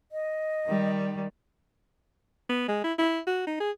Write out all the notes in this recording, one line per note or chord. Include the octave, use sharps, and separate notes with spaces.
D#5
D#3 G3
B3
G#3
E4
E4
F#4
D#4
G#4